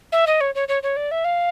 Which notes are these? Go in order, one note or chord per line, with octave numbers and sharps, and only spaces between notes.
E5
D#5
C#5
C#5
C#5
C#5
D5
E5
F5